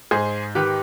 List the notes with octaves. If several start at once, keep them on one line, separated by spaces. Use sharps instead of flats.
G#2 G#4 C5
D#3 G4 B4